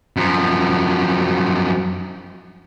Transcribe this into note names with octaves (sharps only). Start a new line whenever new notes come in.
F#2 F3